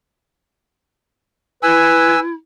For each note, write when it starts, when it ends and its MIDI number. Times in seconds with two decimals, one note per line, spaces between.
1.63 2.34 64
1.63 2.18 71
1.63 2.20 80
1.63 2.20 88